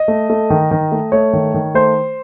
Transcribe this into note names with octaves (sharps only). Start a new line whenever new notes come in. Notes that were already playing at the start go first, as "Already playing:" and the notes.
Already playing: D#5
A3
A3
D#3
D#3
A3
A3 C#5
D#3
D#3
A3 C5